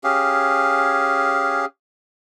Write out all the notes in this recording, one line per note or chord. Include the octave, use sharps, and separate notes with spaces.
C#4 G4 G#4 F5